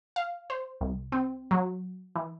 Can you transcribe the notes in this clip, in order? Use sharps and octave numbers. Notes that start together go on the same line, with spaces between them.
F5
C5
C2
C4
F#3
E3